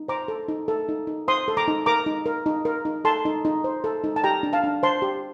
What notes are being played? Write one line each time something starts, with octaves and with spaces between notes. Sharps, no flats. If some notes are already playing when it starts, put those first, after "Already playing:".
Already playing: D#4
C5 A#5 D6
A4
D#4
A4
D#4
D#4
C5 C6 D#6
A4
A#5 D6
D#4
A#4 A#5 D6
D#4
A#4
D#4
A#4
D#4
A4 A5 C6
D#4
D#4
C5
A4
D#4
A5
G4 G5 A#5
D4
F5 A5
D4
C5 A5 C6
G4